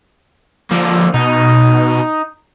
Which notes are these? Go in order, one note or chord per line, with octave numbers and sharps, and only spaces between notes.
D3 F3 A#3
B2 D#4